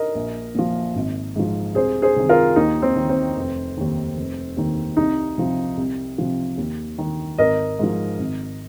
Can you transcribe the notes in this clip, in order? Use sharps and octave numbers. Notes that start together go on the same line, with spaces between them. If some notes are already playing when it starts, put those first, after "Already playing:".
Already playing: A#4 D#5
A#1
A#2 F3
G#1
G#2 F3
C2 G#4 C5
G#4 C5
C3 D#3
F4 A#4
D#2 D#4
C4
D#3
C4
F1
D#2 D#3
F1
D#2 D#3
C2 D#4
C3 F3
C2
C3 F3
D#2
D#3
G#1 A#4 D#5
G#2 F3
G#1